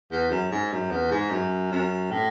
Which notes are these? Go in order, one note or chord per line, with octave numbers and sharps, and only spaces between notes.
E2
F#2
G#2
F#2
E2
G#2
F#2
F#2
A2